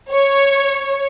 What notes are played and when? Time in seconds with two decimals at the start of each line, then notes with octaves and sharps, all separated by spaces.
0.12 C#5